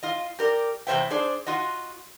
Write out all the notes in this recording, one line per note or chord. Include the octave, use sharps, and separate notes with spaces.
F4 D#5
G4 A#4 D5
E2 C3 C#4 C5 E5 G5
D4 G#4 C5 D5
F4 F#4 D#5